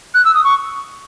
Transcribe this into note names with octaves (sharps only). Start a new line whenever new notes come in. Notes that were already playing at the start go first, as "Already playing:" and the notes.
F#6
E6
D#6
C#6